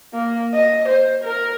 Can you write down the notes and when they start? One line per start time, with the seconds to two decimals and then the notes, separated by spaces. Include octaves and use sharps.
0.14 A#3
0.54 D#5
0.89 C5
1.24 A#4